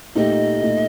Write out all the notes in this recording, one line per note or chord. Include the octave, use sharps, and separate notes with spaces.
A#2 A3 D#4 G4 D#5
A#2 A3 D#4